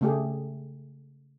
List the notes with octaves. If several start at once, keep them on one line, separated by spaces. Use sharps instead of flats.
C#3 A3 G4 G#4